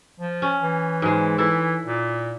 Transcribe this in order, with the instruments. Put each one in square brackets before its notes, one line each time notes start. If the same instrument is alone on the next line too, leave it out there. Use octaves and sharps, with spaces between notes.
[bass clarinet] F3
[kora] C#4
[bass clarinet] E3
[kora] G#2 G#3
[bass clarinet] E3 [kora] E4 A4
[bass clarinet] A#2